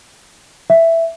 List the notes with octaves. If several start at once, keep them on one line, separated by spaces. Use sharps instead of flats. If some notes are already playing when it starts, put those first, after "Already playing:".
E5